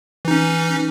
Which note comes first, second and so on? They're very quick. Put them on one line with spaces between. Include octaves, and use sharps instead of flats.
E3 D#4 C#4